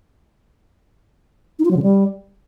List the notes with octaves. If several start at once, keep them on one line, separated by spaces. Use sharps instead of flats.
D#4
F4
F#3
C#3
G3